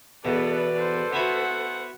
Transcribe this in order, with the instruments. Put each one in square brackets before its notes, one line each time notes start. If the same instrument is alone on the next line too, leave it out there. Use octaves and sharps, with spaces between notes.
[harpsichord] E2 B2 [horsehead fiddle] B3 A4 [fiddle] B4 D5
[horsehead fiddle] A4 C5
[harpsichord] B3 E4 F#4 [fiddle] F#5